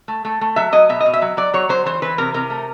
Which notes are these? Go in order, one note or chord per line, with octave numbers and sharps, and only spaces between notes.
A3
A3
A3
F#3 E5
F#3 D#5
B2 E5
D#5
B2
E5
F#3
F#3 D5
F#3 C#5
F#3 C5
E3 C5
E3 B4
C3 A#4
C3 A#4
A3